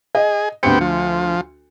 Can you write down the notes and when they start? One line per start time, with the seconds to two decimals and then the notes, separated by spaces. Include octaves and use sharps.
0.15 G#4 D#5
0.63 D2 B3 C4 G4 C#7
0.81 F3